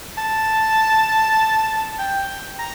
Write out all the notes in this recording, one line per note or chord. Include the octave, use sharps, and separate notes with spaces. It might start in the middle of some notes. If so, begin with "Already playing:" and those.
A5
G5
A#5